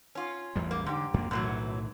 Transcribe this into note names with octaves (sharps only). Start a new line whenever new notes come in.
C#4 F4
A1 E2 G3
A#3
G#2 D3 G4
F2 A#3
B1 F#2 A2 D#3 E3 F#3